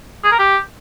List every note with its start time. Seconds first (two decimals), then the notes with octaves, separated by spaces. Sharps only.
0.24 G#4
0.31 A#4
0.39 G4